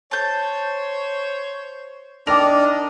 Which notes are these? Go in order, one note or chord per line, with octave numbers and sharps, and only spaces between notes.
C5 C#5 A5 G6
D4 D#4 A#4 D#5 G5 D6 F7